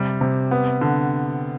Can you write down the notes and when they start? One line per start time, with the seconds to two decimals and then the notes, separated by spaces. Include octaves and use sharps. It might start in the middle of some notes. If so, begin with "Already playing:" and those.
Already playing: C3 G3
0.21 C3
0.51 B3
0.81 D3